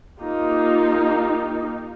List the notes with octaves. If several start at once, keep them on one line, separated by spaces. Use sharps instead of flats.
A#3 D#4 F4 G4